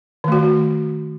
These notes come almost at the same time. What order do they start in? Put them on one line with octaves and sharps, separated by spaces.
D#3 A3 F#4